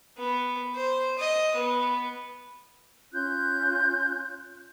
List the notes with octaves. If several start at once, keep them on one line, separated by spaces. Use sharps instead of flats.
B3
C5
D#5
B3
C#4 F4 F#6 G6